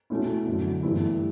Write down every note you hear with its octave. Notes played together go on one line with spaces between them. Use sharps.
B2 A3 C#4 E4
F#2 D3 F#3
G2 E3 A3 E4